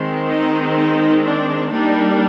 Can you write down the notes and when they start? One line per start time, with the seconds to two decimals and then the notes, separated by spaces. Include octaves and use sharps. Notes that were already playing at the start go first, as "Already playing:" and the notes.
Already playing: D#3 G#3 C4
0.28 D#4
0.76 D#4
1.24 D4
1.71 G3 A#3 D4 D#4